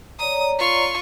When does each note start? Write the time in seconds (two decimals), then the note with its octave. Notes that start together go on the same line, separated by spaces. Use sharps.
0.19 C#5 D5 A#5 D#6
0.59 F4 C#6